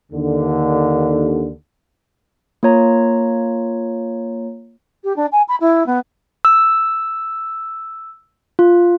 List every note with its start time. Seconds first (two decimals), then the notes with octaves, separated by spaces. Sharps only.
0.12 D#2 D3
2.63 A#3 F4 C#5 A#5
5.04 G4
5.16 D4
5.32 G#5
5.48 B5
5.60 E4
5.86 B3
6.45 E6
8.59 F4